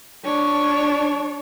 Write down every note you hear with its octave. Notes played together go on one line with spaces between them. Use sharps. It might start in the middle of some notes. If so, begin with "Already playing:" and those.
D4 C#5